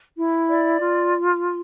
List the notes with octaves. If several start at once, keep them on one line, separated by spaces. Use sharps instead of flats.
E4
D5
F4